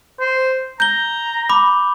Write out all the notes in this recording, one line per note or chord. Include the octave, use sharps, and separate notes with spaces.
C5
A#5 G6 G7
B5 D6